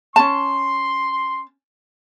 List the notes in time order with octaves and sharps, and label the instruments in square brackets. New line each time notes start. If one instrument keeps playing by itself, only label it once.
[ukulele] C#4 A5 [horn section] C6